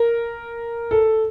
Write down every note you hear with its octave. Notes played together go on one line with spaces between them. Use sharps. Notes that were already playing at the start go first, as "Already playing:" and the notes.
Already playing: A#4
A4